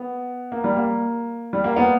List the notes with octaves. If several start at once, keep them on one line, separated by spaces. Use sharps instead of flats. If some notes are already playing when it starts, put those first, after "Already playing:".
Already playing: B3
A#3
G3
A#3
G3
A#3
B3